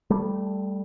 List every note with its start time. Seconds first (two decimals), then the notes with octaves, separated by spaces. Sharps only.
0.10 G3 A3